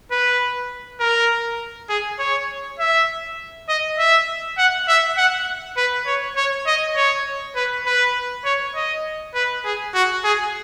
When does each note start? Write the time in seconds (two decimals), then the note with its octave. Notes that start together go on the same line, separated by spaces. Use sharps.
0.11 B4
1.00 A#4
1.89 G#4
2.19 C#5
2.79 E5
3.69 D#5
3.98 E5
4.58 F#5
4.88 E5
5.18 F#5
5.77 B4
6.06 C#5
6.36 C#5
6.67 D#5
6.96 C#5
7.55 B4
7.86 B4
8.45 C#5
8.75 D#5
9.35 B4
9.65 G#4
9.94 F#4
10.24 G#4